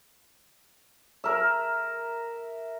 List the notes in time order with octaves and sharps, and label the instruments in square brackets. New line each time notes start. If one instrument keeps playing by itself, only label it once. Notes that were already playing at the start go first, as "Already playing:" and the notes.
[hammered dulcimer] A#4 E5